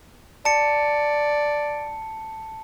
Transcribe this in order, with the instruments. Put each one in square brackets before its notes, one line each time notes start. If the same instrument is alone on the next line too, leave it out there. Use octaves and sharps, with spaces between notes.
[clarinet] D5 [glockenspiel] A5 C#7